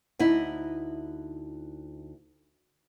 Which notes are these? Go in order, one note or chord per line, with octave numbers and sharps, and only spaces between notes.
D2 D#4 E4